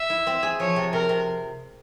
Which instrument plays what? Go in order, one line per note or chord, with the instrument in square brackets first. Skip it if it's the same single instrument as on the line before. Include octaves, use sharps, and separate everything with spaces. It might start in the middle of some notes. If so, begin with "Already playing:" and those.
Already playing: [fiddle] E5
[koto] E4
C4
G#4
[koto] F3 [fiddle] C#5
[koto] C3
[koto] C3 [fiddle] A#4
[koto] C3